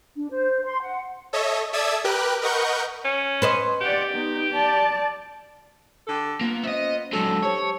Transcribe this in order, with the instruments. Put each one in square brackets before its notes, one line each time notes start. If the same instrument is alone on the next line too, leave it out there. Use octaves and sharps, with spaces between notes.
[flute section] D4
C5
C6
F#5
[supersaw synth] A4 C#5 D#5 E5
A4 D5 E5 D#6 E6 G#6
G4 A#4 B4 G5 F#6
A#4 B4 D#5 F#5 C#6 G6
[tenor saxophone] C#4
[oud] B4 C5 D#5
[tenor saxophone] G4 [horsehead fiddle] D5 F#5
[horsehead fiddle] B3 D#4
D5 A5
[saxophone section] D3 G4 A4
[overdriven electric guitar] A#3 [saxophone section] B3 F4
[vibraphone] C#4 C5 [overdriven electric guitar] D#5 E5
[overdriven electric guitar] D3 F#3 [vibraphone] G#3 [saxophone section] A4
[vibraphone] G4 C5 A5 [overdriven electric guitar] C#5